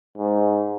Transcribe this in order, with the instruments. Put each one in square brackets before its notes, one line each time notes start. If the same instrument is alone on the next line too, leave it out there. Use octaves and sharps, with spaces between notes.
[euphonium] G#2